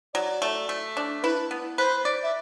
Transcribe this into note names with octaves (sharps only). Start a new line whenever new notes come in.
F#3 D5
A3
A3
D4
E4 B4
B3
B4 C5
D5
E5